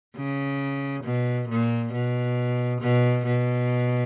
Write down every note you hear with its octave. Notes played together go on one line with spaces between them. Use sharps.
C#3
B2
A#2
B2
B2
B2